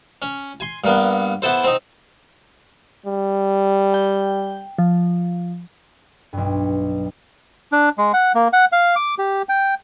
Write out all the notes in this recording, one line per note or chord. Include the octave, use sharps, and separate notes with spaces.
C#4
G#5 C6
G2 A#3 B3
B3 E4 A4 C5
C4 D#4
G3
G5
F3
B1 G2
D4
G#3
F#5
A#3
F#5
F5
D6
G4
G5